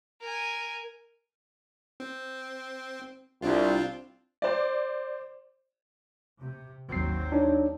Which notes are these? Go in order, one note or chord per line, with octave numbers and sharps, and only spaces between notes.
A#4 G#5
C4
C2 C4 D4 F4
C5 D5
C3
G#1 D#2 F#3 C4 C7
D4 D#4 C#5